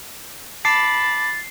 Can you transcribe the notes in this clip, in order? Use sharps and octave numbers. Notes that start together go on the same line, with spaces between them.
A5 B5 D6 A6 C7 C#7